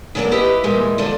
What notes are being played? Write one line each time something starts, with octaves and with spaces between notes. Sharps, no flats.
C#3 F#3 G3 A#3 D4
E4 G4 B4 D#5
A#2 E3 G3 G#3
D3 F3 D4